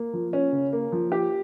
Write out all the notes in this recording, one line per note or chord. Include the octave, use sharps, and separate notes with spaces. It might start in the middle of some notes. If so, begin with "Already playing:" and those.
Already playing: A#3
F3
C#4
C#3
A#3
F3
G4